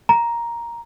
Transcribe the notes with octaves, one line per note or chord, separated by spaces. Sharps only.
A#5